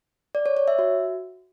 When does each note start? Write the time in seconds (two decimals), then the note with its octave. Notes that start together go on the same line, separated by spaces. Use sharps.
0.35 D5
0.46 C#5
0.57 C#5
0.68 E5
0.79 F#4